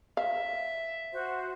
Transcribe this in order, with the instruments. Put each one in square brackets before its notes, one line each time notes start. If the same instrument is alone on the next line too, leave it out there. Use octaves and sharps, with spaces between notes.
[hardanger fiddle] E5 [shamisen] F5
[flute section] F#4 C5